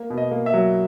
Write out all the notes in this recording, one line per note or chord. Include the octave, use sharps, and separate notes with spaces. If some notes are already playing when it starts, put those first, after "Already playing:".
Already playing: A#3
B2
D#5
A#3
E5
F#3